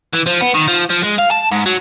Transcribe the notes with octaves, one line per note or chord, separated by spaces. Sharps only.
E3
F3
B3
D#3
F3
F3
G#3
F5
A5
G#2
F#3